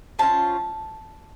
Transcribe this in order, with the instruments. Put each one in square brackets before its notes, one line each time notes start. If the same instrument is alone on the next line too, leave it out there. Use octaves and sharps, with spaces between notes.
[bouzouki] F3 C#4 F4 A5